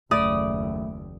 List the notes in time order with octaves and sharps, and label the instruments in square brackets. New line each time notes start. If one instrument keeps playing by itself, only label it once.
[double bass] F#1 D#2 [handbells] A3 [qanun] D5 [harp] D#6